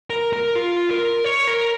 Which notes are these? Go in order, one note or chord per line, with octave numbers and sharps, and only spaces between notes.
A#4
A#4
F4
A#4
C#5
A#4